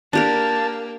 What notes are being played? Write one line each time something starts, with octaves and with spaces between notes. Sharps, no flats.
A#3 D4 G4 A#4 A5